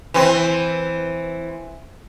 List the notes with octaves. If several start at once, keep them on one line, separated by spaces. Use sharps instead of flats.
E3 C4